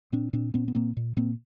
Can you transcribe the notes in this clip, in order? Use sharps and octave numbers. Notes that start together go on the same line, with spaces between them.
A#2 C4 D4
A#2 C4 D4
A#2 B3 C#4
B3
A#2 A#3 C4
A#2
A#2 A#3 C4